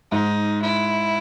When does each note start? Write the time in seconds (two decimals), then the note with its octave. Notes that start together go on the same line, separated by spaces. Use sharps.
0.11 G#2 D#4
0.62 E4